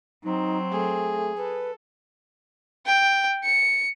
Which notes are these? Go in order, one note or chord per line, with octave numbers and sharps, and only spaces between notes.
F#3 C4 D#4
A3 G#4
A4 B4
G5
C#7